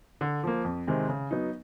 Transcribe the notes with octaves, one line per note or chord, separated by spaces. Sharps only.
D3
F3 A#3
F2
C3 D#3 G#3 C4
C#3
F#3 B3 D#4